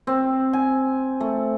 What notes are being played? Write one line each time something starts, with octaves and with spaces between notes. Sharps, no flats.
C4
G#5
A3